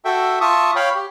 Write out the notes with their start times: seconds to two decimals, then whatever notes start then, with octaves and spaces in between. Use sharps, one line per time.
0.05 F#4 A4 E5 G5
0.41 F4 E5 A5 C#6 D#6
0.76 C#5 F5 G5 B5
0.95 G4